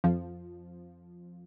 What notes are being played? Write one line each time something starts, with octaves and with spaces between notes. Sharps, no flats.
F2 F3